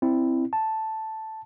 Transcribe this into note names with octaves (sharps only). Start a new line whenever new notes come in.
C4 E4
A5